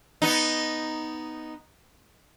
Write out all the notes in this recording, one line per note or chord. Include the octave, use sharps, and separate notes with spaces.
B3 D#4